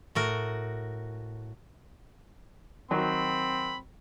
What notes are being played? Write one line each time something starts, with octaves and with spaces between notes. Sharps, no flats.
A2 F#4 A#4
D#3 F#3 C4 B5